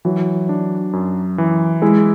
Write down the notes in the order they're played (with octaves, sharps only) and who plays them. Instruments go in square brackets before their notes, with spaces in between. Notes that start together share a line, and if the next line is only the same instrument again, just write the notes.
[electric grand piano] E3 [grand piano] F#3
[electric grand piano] D4
F#2
E3
[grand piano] G#3 [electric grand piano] E4